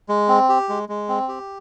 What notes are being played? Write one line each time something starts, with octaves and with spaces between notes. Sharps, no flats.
G#3
C4
G4
G#3
G#3
C4
G4